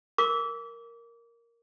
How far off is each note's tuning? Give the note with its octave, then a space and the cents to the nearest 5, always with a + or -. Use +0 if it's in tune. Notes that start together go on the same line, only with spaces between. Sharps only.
A#4 +0 D6 -30